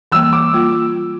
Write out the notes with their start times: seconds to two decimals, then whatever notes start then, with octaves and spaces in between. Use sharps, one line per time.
0.12 E3 G3 A#3 E6
0.33 D6
0.53 G3 A#3 F4